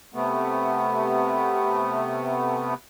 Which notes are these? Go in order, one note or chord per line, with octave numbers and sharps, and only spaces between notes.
C3 A3 B3